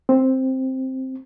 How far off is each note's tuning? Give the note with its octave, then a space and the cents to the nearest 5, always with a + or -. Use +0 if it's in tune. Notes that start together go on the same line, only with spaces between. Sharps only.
C4 +5